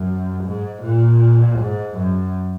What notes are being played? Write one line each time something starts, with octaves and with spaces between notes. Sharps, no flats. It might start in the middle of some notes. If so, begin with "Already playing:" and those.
Already playing: F#2
G#2
A#2
G#2
F#2